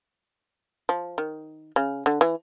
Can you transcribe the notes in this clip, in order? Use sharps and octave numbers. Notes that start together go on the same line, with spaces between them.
F3
D#3
C#3
D3
E3